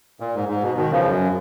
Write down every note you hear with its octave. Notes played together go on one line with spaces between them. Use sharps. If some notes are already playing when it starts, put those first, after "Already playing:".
A#2
G#2
G#2
B2
B2 D#3
C#3 F3
F#2